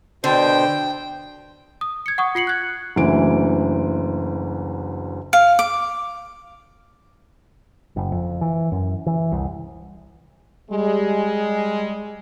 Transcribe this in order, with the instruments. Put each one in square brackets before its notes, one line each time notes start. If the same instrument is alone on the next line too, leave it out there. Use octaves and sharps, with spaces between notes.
[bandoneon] B2 C5 [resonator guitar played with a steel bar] D3 [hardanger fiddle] G5
[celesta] D#6
G#6 C#7
F#5 C#6 D#6
F4 C7 C#7 F#7
F#6 G#6
[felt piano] F#1 D2 E3 D7
[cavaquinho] F5
D6
[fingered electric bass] F#1
F2
E3
F#2
E3
C2
[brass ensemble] G3 G#3